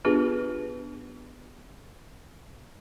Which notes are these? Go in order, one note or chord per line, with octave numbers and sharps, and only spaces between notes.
B3 D4 F4 G4 G#4 B4